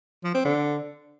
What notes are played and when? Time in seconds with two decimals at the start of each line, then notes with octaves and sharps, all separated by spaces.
0.24 F3
0.34 C4
0.45 D3